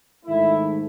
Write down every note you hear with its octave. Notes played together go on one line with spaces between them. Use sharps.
G#2 D#3 A3 E4